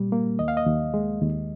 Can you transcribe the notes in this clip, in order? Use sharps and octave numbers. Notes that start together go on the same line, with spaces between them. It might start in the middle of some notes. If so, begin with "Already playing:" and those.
Already playing: A#2 G3
A#3
D#2 D#5
F5
D#5
D#2
G#3
D#2